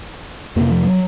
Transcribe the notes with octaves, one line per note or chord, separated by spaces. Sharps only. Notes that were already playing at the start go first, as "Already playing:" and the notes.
F2 C3 A#3
F3
F#3